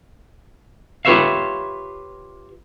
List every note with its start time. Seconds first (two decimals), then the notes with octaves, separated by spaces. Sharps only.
1.05 F4 G4 B4 C#5 E5 F5